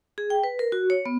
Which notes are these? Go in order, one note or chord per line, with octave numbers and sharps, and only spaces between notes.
G#4
G5
B4
A#4
F#4
C#5
B3